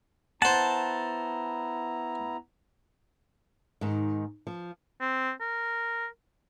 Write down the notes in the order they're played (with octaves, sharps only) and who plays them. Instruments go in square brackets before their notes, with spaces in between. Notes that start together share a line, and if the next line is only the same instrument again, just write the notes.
[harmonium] B3 E4 A#5 [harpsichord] C5 F#5 [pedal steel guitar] A5
[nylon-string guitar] G#2 D#3
F3
[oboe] C4
A#4